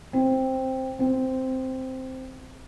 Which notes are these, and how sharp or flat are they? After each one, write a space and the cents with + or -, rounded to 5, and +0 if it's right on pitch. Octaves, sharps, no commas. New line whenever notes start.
C4 +5
C4 -5